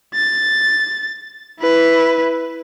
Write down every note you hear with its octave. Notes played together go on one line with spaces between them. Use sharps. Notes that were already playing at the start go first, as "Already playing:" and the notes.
A6
E4 B4